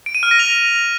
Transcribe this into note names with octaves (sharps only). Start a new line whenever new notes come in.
D7
D#7
F6
A#6
F7